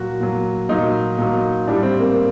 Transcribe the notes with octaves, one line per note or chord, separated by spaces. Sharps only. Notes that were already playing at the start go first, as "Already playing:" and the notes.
Already playing: A#2 F#3 F#4
A#2 F#3
A#2 F#3 D#4
A#2 F#3
A2 G3 D4
C4
A#3